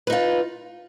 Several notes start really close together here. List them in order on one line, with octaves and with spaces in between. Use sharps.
B4 D#4 F4